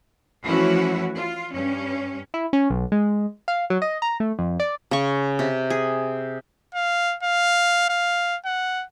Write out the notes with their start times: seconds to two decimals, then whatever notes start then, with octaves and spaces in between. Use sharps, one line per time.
0.44 E3 F3 A3 C#4 E4 F#4
1.16 F4
1.53 G2 C#4
2.34 E4
2.53 C#4
2.70 B1
2.92 G#3
3.48 F5
3.70 F#3
3.82 D#5
4.02 A#5
4.20 A3
4.39 F2
4.60 D5
4.91 C#3 C#6
5.39 C3
5.70 G#4
6.75 F5
7.23 F5
7.90 F5
8.46 F#5